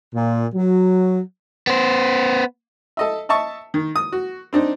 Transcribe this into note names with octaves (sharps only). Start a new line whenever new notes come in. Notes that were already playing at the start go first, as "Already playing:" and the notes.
A#2
F#3
B3 C5
A4 D#5 E5
D#5 E5 A5 C#6
D#3
D#6
F#4
C4 D4 D#4